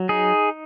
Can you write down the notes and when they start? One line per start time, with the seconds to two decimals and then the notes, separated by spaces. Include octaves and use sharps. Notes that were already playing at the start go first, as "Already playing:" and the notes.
Already playing: F#3
0.09 D#4 G#4